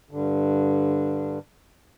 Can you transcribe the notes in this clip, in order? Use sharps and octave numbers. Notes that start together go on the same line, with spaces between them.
G2 D3